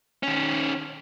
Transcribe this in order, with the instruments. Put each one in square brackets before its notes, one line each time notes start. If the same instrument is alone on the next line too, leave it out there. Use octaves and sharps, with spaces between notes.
[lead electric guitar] D#3 C#4